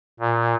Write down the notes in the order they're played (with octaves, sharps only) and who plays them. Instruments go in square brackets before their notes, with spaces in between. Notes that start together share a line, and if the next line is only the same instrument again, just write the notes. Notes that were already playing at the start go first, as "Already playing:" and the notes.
[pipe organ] A#2